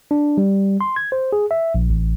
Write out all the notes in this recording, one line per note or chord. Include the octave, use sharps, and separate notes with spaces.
D4
G3
C6
G#6
C5
G#4
E5
A#1
A1